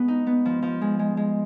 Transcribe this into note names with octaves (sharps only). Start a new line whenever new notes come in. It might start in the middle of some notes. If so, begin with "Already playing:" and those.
Already playing: G#3 B3
D#4
B3
F3
F3
G#3
G#3
G#3